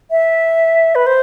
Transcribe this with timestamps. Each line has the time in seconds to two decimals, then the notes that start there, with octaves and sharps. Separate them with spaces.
0.11 E5
0.95 B4
1.07 C5